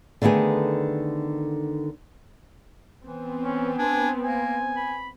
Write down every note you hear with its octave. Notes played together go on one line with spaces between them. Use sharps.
D3 D#3 A3 B3 G#4
E3 B3 C4
C#4
D4 G#5
A#3 G#5
B5